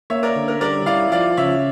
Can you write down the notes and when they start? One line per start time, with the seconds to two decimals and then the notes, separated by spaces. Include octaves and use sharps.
0.10 A#3 C#5 E5
0.23 A#4 D5
0.36 D3
0.48 A#4
0.61 G3 A#4 D5
0.86 E4 D5 F5
1.12 F3 D5 F5
1.37 C#3 C#5 E5